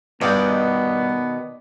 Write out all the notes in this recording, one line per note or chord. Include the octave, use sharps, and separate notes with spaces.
G2 B2 D#3 B3 D5 D#5 G5